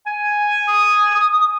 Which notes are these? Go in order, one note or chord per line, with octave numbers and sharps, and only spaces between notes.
G#5
D#6